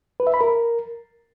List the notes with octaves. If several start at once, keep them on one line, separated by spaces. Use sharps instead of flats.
B4
E5
B5
A#4